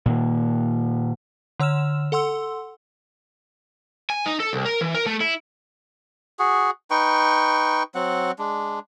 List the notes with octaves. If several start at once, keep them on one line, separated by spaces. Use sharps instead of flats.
A#2 D#3 A#3
D3 C#5 E6 F6 E7
A4 F#5 C6 E6
G#5
D#4
A4
C2
A#4
E3
A#4
A3
E4
F#4 G#4
D#4 B4 G5 C#6
F#3 C4 F#5
G#3 D4